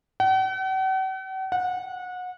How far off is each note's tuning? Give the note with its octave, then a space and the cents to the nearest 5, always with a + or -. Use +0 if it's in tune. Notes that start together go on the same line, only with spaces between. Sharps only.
F#5 +45
F#5 -25